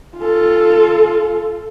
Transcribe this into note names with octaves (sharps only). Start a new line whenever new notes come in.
F4 A4